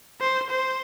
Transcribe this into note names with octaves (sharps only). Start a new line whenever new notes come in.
C5
C5